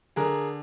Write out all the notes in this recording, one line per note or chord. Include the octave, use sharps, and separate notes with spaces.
D3 G#4 A#4